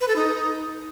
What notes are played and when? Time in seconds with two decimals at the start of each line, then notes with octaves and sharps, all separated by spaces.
0.01 B4
0.08 A4
0.16 D#4